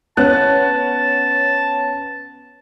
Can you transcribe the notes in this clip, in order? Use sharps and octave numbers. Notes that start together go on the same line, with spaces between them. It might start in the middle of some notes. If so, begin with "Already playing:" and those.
B3 C#4 A5 F#6